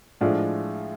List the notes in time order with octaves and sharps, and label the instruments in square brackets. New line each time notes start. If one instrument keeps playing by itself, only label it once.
[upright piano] A2 F3 G#3 D4 F4